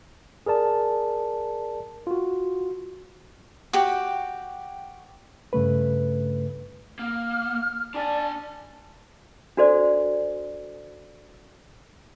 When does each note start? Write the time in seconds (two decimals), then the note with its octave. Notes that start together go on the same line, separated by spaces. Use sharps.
0.46 G#4 A#4 D5 A5
2.07 F4 F#4
3.73 F#4 G4 G5
5.53 G2 C#3 A3 B4
6.99 A#3 F6
7.94 D4 D5 G#5 A5
9.57 D4 F#4 A4 C5 D5